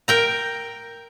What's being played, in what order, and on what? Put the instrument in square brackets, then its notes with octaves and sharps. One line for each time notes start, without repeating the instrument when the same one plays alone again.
[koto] A#4 G5 A#5